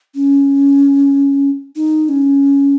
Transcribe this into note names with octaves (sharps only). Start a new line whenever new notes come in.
C#4
D#4
C#4